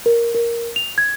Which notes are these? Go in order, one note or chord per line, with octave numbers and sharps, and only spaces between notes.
A#4
A#4
F7
G#6